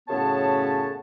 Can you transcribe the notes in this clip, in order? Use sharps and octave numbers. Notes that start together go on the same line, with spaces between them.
F#2 A2 C#3 B3 C#5 A5